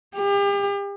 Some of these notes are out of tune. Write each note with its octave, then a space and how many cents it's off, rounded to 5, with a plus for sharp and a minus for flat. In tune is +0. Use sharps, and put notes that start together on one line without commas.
G4 +40